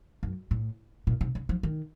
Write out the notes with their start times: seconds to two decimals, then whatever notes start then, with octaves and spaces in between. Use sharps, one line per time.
0.23 F#2
0.51 A2
1.07 A#2
1.21 C3
1.35 C#3
1.49 F3
1.63 D#3